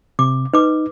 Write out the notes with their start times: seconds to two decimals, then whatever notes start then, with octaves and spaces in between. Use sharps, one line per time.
0.19 C3 D6
0.54 D#4 B4 D6